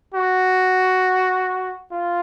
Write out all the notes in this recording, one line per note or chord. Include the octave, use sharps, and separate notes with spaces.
F#4
F4